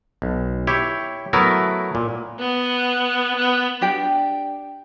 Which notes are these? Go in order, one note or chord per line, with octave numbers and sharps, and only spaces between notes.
B1
E4 G4 C#5
F#3 A3 B3 E4 A#4
A#2
B3
B3
D4 G4 G5